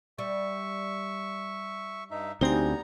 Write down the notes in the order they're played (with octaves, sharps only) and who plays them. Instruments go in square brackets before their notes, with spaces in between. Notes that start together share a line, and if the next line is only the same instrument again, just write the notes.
[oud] G3 [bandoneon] E5 C#6
[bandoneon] G2 D#4 E5
[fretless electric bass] D2 C4 [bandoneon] G3 B3 A#5 [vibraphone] D#4 G4 G#5